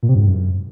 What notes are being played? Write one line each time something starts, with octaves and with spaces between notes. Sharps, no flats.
A#2
C3
G2
G#2
F#2